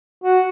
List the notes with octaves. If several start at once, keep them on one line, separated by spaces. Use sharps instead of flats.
F#4